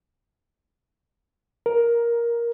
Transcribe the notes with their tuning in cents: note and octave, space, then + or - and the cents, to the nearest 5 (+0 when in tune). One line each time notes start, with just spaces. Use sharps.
A#4 +10